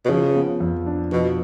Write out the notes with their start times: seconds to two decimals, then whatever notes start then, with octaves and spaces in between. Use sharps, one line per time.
0.05 B2
0.09 C#3 F3
0.36 B3
0.60 F2
0.86 D4
1.12 B2 F3